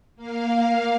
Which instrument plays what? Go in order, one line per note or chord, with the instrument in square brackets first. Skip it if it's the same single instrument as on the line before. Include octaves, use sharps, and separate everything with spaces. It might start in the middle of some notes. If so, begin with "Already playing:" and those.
[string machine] A#3 F5